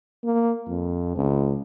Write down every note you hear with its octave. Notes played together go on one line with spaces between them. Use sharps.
A#3
F2
C#2